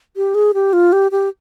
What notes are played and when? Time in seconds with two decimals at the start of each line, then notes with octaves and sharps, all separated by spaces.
0.17 G4
0.34 G#4
0.54 G4
0.73 F4
0.93 G4
1.12 G4